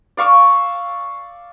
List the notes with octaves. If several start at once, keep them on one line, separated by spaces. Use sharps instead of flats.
D5 F5 C#6 E6